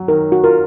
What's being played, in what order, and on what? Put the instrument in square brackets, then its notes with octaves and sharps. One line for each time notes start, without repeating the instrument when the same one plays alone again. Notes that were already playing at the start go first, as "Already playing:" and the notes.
Already playing: [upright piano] F#3
[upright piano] D#3 [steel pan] A#4
[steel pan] F#4
[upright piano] F4 [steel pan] A#4